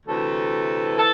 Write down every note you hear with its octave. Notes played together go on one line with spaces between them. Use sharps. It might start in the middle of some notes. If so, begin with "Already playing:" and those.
D2 C3 E3 A4
E3 A4